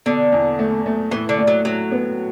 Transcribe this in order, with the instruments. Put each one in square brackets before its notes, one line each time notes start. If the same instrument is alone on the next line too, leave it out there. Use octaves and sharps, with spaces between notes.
[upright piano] B2 [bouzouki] D3
[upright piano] E2
A3
A3
[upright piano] A2 [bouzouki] E3
[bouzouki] D3
[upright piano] A2
[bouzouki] F#3
[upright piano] A2 [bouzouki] F#3
[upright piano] B3